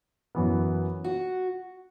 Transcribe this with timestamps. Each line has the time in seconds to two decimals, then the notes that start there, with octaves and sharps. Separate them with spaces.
0.35 F#2 E3 B3
1.04 F#4